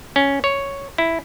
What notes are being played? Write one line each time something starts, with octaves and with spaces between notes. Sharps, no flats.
C#4
C#5
E4